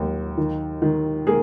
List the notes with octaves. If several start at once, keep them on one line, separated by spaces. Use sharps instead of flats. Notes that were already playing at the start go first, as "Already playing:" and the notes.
Already playing: D#2 F#3
D#3
D#3
A#3 G#4